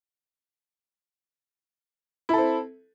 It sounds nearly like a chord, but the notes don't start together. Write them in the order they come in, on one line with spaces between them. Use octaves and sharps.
E4 A4 C4